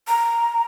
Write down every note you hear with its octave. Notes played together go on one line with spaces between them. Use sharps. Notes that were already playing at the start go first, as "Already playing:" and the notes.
A#5